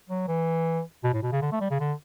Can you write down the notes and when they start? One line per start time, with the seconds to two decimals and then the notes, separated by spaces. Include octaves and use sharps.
0.09 F#3
0.28 E3
1.04 B2
1.13 A2
1.23 B2
1.32 C#3
1.42 D3
1.52 A3
1.60 G3
1.70 C#3
1.80 D3